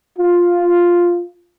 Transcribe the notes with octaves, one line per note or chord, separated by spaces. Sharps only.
F4